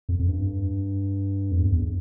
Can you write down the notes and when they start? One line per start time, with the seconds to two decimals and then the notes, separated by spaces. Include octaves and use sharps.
0.09 F2
0.19 F2
0.28 G2
1.51 F2
1.59 E2
1.72 E2